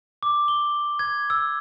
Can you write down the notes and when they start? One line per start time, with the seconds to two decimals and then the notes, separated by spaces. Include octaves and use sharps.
0.23 D6
0.48 G7
0.99 G#6
1.30 E6